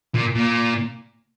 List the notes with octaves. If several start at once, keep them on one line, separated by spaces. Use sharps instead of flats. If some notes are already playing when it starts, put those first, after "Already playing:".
A#2
A#2